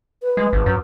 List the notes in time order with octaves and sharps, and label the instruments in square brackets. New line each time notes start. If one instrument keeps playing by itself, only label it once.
[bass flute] B4
[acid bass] G#3
G#1
F#2